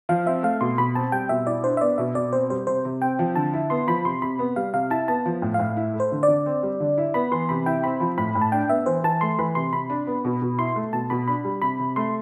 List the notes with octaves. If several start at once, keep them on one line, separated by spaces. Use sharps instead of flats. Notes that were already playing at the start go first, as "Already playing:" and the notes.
F3 F5
C4 E5
A3 F5
B2 C6
B2 B5
C4 A5
G3 G5
B2 E5
E4 D5
D4 C5
E5
B3 D5
B2 E5
B2 D5
C4 C5
G3 C5
C3 C5
C3
C4 G5
F3
D3 A5
E4
B3 C6
F3 B5
C3 C6
C3 B5
B3
G3 F5
C3 F5
E4 A5
B3 A5
F3
A2
A2 F5
E4
A3
C5
D3
D5
D3
C4
G3
D3
E4
B3 B5
E3 C6
C3 B5
E4 G5
C4 B5
F3
A2 B5
A2
A5
D4 G5
B3 E5
E3 C5
E3 A5
A3 C6
E3 B5
C3 C6
C3 B5
D4
B3
B2
B2
E4 C6
A3
B2 A5
B2 B5
D4 B5
G3
C3 B5
C3
A3 C6